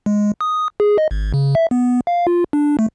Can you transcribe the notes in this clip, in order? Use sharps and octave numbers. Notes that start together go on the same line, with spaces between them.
G#3
D#6
G#4
D#5
G#1
C#3
E5
B3
F5
F4
D4
A3